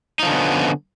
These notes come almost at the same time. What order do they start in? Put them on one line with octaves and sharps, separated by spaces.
D#4 F3 D3 C#4 B3